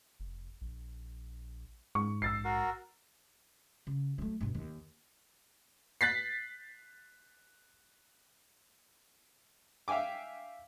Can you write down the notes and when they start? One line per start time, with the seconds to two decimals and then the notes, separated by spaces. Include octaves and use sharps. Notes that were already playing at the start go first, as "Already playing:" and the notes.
0.20 F1
0.61 A#1
1.95 G#2 C#6
2.22 A#1 E6 A6 C7
2.45 F#4 A#4
3.87 C#3
4.18 F#3 A3
4.41 G2 B2
4.55 D#2
6.01 F#6 A6 B6 C7
9.88 E5 F5 G5 G#5 D6